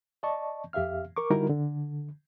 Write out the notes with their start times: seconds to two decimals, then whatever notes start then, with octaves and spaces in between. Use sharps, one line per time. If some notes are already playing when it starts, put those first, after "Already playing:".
0.23 D5 D#5 A5 C#6
0.73 F2 G4 E5 F5 F6
1.16 A#4 C#6 D6
1.30 D3 G3 D#4 E4 F#4 A#4
1.50 D3